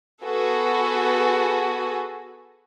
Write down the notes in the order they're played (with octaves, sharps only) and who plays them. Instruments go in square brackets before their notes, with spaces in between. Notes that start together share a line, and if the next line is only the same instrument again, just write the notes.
[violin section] B3 F#4 G#4 A4 B4